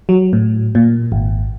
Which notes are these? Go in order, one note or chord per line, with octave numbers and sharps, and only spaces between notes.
F#3
A2
A#2
G#1